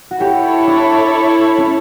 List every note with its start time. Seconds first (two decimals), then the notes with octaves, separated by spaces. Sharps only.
0.11 F#4
0.20 E4 G4 A4 C#5
0.67 D4
1.58 C#4